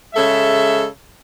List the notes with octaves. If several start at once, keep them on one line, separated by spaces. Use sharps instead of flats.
C#3 G#3 A4 E5